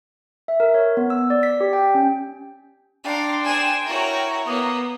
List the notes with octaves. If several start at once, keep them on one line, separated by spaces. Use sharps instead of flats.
E5
A#4
C#5
B3
E6
D5
B6
G4
G5
C#4
D4 F5 G5 A#5 C6
G#4 C5 G#5 E7
E4 F#4 A#4 C#5 A#5
A#3 B3 D#6